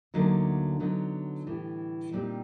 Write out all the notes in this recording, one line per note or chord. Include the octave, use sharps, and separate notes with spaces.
D2 D3 F#3 A#3 D#4
D3 F#3 B3 D#4
A2 E3 G3
A#2 G3 C4 D#4